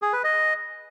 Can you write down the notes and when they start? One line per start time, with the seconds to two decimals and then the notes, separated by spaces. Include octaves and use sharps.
0.02 G#4
0.13 B4
0.24 D#5